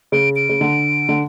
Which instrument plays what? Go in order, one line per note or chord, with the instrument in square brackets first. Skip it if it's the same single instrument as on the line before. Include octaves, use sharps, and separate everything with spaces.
[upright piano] C#3 [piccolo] D7
[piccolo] D7
[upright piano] C#3
D3
D3